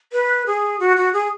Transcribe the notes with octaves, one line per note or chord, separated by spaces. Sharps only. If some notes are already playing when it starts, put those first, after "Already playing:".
B4
G#4
F#4
F#4
G#4